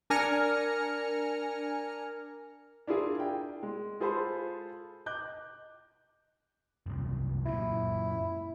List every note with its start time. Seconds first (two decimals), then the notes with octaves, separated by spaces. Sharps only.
0.10 D4 A#4 G#5 F6 A#6 C#7
2.87 D4 E4 F4 G#4 A#4
3.20 G5
3.63 G#3
4.00 F4 G#4 A4 C5 A5 B5
5.06 D#5 D6 F#6 G6
6.86 F#1 C2
7.46 F#2 A#2 E4